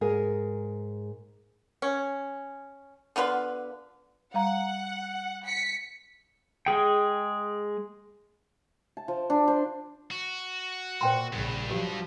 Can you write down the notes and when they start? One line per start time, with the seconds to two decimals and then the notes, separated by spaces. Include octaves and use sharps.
0.01 G#2 G#4 A#4
1.82 C#4
3.16 D3 B3 F4 B4
4.34 G3 F5 F#5 A#5
5.45 B6 C#7
6.66 G#3 G#4 G5
8.97 A5
9.08 F3
9.30 D4
9.48 C5
10.11 F#4
11.01 A#2 C5 G5 C6
11.33 A#1 G2 C#3
11.71 F3 F#3 G4